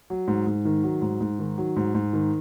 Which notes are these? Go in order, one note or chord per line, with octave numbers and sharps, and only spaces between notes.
F#3
G#2
G#2
D#3
F#3
G#2
G#2
D#3
F#3
G#2
G#2
D#3